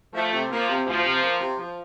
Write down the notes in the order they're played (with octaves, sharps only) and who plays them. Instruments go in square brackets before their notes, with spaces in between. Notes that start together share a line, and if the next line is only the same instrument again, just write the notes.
[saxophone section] F3 [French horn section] A3
[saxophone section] C3
[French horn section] F3 [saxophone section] A#3
[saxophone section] C3
[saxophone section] D2 [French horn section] F3
[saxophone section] C3
A#3
C3
F3